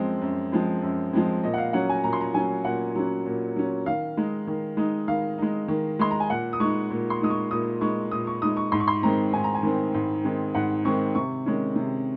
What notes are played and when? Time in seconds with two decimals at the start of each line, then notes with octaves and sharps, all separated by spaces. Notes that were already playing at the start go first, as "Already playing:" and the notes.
Already playing: F#2 F3 G#3 C4
0.22 F#2
0.52 F3 G#3 C4
0.82 F#2
1.13 F3 G#3 C4
1.43 A#2 D#5
1.54 F#5
1.58 F5
1.73 F#3 C#4 F#5
1.89 G#5
2.04 A#2 A#5
2.13 C6
2.20 A#5
2.34 F#3 C#4 G#5
2.65 A#2 F#5
2.95 F#3 C#4
3.26 A#2
3.56 F#3 C#4
3.86 D#3 F5
4.17 G#3 D#4
4.47 D#3
4.77 G#3 D#4
5.08 D#3 F5
5.38 G#3 D#4
5.68 D#3
5.99 G#3 D#4 C6
6.11 A#5
6.20 G#5
6.30 A#2 F#5
6.53 D#6
6.60 G#3 D#4 C#6
6.90 A#2
7.10 C6
7.21 G#3 D#4 D#6
7.30 C#6
7.51 A#2 D#6
7.81 G#3 D#4 C#6
8.11 A#2 D#6
8.27 C#6
8.42 G#3 D#4 D#6
8.57 C#6
8.72 G#2 C6
8.80 C#6
8.88 C6
9.03 D#3 G#3 C4 A#5
9.33 G#2 G#5
9.44 A#5
9.55 G#5
9.63 D#3 G#3 C4
9.94 G#2
10.24 D#3 G#3 C4
10.55 G#2 F#5
10.85 D#3 G#3 C4 C#6
11.15 C3 C#6
11.46 D#3 G#3 C#4
11.76 C3